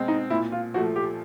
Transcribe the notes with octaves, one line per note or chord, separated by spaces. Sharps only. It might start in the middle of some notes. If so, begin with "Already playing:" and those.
Already playing: B2 G#3 C4
D#4
A#2 E4
F4
F3 A3 F#4
G4